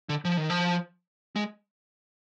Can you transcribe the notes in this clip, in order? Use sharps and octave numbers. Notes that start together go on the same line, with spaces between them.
D3
F3
D#3
F3
G#3